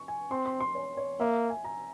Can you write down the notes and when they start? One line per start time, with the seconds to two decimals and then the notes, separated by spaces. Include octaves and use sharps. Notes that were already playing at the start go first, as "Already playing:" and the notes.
Already playing: C#6
0.08 G#5
0.31 C4 C6
0.45 C6
0.60 C6
0.75 C#5
0.97 C#5
1.20 A#3 E5
1.50 G#5
1.64 A#5